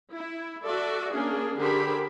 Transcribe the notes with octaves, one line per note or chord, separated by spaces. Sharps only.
E4
F#4 A4 D5 E5
A#3 C#4 D4 G#4
D3 G4 G#4 A#4 C5 B5